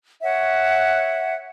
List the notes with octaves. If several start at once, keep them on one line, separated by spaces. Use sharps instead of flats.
C#5 E5 F#5